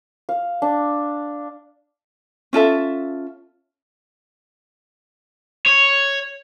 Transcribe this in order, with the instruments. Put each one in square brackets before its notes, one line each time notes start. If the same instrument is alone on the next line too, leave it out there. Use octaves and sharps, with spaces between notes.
[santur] F5
D4
[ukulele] C#4 F4 A4 E5
[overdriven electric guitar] C#5